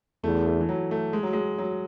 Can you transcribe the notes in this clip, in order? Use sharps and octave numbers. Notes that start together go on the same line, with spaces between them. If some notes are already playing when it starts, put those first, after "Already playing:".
E2 A3
A3
E3
F#3
A3
G#3
F#3
G#3
F#3